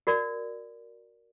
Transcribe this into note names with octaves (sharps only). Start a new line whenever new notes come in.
F#4 A#4 D5